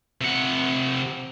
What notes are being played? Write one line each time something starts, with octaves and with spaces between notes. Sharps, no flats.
C3 F#5